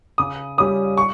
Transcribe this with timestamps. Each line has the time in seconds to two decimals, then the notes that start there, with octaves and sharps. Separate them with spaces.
0.18 C#3 D#6
0.58 G3 C#4 D#6
0.98 C#6